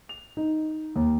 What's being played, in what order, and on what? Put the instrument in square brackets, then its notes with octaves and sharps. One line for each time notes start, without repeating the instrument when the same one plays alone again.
[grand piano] F7
D#4
D#2